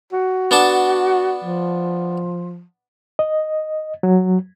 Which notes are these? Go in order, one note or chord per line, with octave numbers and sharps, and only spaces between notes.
F#4
B3 D4 A5
F3
D#5
F#3